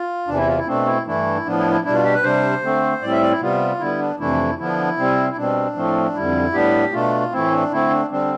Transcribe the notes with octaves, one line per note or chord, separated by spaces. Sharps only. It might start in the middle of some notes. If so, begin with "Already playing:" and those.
Already playing: F4
E2 C3 E3 D4
E4
F4
E4
B2 A3 C4 D4
E4
G2 E3 A3 D4 E4
A2 F3 B3 D4
E4
E4
B2 G3 D4 E4
F4
G4
B4
C3 G3 D4 C5
D3 A3 C4
A2 G3 C4 D5
E5
D5
E4
C3 G3 B3 F4
D3 G3 B3 E4
D4
F2 C3 E3 A3 D4 E4
D3 F3 B3 D4 E4
C3 G3 C4
E4
B2 G3 C4 D4
A2 F3 A3 C4
F2 D3 G3 E4
A2 G3 B3 D4 G4
B2 A3 D4 F4
A2 E3 A3 C4 E4
D4
D3 A3 C4 E4
D4
D3 G3 C4 D4